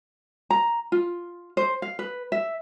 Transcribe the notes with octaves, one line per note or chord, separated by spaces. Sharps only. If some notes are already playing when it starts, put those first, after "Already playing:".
A#5
F4
C5
F5
B4
E5